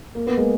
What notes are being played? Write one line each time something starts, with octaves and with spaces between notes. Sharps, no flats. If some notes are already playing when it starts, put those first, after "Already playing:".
A#3
B3
G#3 A#3